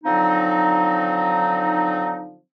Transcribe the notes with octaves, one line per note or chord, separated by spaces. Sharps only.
D3 F3 F#3 C4 D#4